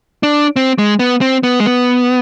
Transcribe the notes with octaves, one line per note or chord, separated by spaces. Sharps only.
D4
C4
G#3
B3
C4
B3
G#3
B3